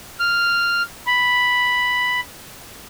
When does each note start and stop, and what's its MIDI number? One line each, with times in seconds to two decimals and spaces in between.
0.20 0.82 89
1.07 2.20 83